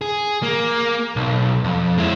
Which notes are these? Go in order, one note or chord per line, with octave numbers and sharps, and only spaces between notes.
G#4
A#3
B1
F2
G#3 E4